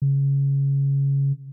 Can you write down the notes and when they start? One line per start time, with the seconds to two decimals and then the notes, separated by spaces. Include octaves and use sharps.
0.02 C#3